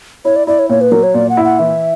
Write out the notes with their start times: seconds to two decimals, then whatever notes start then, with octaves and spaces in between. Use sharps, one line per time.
0.25 E4 C#5
0.36 D5
0.47 E4 D5
0.59 C#5
0.70 A#2 C#5
0.81 B4
0.92 F#3 A#4
1.03 C#5
1.14 A#2 D5
1.29 F#5
1.37 E4
1.45 F#5
1.59 E3 E5